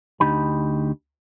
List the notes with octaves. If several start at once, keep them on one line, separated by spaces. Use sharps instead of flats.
D2 D4 D#4 G4 B5